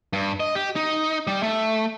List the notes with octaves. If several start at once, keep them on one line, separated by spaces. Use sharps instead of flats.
G2
D#5
G4
D#4
G3
A3